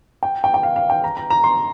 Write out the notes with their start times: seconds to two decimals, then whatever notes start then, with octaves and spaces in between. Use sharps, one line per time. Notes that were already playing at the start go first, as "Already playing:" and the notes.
0.23 G5
0.44 G5
0.54 G5
0.63 F5
0.76 F5
0.90 G5
1.04 A#5
1.17 A#5
1.30 A#5
1.44 C6